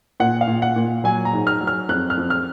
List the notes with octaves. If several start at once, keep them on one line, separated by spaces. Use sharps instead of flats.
A#2 F#5
F5
A#2
F#5
A#2
F#3 G#5
A#5
G#2
F6
F#3
F6
F2 F#6
F6
F2
F6